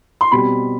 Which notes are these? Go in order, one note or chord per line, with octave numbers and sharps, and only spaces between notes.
C6
B2 G3 C4 B5